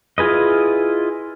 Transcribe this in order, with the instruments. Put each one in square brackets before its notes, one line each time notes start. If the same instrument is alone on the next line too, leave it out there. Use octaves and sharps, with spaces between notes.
[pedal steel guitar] E4 F4 G#4 B4 D#5